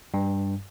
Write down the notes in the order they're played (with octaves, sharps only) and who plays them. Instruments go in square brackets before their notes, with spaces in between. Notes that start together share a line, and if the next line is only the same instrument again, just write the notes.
[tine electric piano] G2